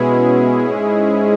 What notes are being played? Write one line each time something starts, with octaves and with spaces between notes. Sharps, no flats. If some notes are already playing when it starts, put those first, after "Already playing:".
Already playing: B2 G#3 B3 C#4 E4 G#4
G#2 G#3